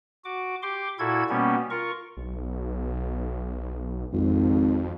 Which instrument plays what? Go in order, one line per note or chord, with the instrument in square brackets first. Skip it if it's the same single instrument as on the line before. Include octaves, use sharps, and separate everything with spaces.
[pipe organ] F#4 D6
G4 C6 D6
A#2 E4 F#4 A4 G#6
B2 G3 A#3 B3 C#4
F4 A#4 C#6
[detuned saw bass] B1
[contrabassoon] G#1 [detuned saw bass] F2